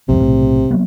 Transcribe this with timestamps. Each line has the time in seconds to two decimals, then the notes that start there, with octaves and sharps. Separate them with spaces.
0.08 B1 F2 G#2 C3
0.20 B1 A2
0.71 F#3 A#3 B3